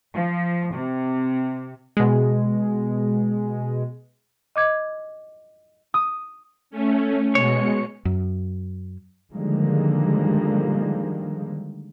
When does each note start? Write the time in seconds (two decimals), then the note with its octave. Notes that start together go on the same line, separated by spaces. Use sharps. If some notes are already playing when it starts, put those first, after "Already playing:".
0.14 F3
0.74 C3
1.97 B2 G#3
4.56 D#5 D6 G#6
5.94 D#6
6.70 A3 C#4
7.35 B2 G#3 C#5 C#7
8.05 F#2
9.33 D3 D#3 F3 G3 G#3 A#3